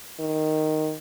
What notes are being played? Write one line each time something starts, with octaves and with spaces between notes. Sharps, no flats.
D#3